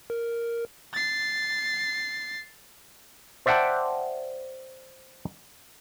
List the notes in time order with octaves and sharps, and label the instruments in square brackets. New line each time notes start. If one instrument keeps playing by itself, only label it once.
[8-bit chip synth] A#4
[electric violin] A6 C7
[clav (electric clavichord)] C5 D5 E5 F#5 G5 A5